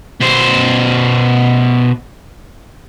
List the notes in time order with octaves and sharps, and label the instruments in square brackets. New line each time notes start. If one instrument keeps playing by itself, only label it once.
[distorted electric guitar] B2 C5